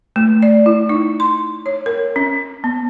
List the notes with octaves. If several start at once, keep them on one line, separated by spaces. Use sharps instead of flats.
A3
D5
E4
D#4
C6
C#5
A#4
C#4
B3